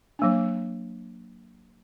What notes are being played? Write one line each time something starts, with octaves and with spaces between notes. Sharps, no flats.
F#3 A#3 D4